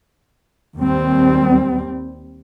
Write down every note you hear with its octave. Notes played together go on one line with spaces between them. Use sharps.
D#2 G3 C4